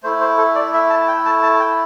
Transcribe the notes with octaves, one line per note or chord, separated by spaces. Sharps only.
A3 E4 C5
C5
A4
D5
E5
A5
G5
A5
A5
G5